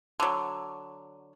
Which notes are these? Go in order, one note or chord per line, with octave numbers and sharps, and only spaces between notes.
D3 F#3